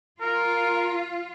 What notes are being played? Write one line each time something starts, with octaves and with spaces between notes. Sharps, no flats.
F4 A#4